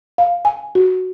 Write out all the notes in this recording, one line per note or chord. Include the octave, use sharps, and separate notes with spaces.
F5
G#5
F#4